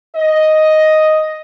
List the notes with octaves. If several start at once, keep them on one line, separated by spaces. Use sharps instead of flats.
D#5